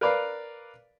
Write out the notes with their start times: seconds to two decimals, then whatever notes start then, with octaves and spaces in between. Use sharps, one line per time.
0.01 A#4 B4 D5 F5